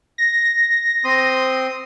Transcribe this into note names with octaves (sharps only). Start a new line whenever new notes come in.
A#6
C4 C6 D#6